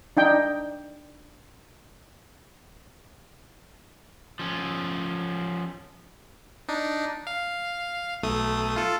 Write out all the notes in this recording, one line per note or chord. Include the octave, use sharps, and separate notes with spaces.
D4 D#4 G5
F3 C#4
D4 D#4
F5
B1 A3 D#6
F4 A4